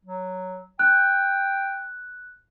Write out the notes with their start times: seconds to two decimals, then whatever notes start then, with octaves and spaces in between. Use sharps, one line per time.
0.05 F#3
0.79 G5 F#6